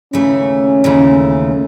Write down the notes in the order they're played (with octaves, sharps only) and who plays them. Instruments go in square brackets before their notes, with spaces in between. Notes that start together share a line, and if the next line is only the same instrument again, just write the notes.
[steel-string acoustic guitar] D#2 C#3 E3 A3 [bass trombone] C#4
[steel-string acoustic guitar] D#2 C#3 E3 A3